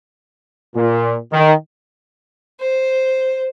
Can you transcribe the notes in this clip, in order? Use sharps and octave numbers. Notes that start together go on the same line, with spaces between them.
A#2
D#3
C5